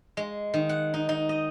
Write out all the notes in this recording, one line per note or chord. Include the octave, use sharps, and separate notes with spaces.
G#3
D#3
F#5
D#4
D#4
D#5